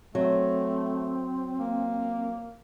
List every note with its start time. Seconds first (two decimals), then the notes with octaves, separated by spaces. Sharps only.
0.15 F#3 A3 C4
1.59 A#3